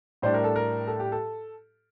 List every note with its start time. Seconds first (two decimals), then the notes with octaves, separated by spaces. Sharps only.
0.22 A2 G3 D4 C5
0.34 A#4
0.44 A4
0.56 A#4
0.87 A4
1.00 G4
1.12 A4